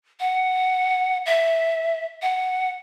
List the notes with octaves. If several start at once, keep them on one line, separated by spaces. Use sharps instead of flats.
F#5
E5
F#5